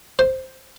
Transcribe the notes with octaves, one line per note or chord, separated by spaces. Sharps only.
C5